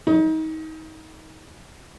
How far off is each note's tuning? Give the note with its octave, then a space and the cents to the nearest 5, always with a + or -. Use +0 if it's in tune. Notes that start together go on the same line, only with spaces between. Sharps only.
D#4 +30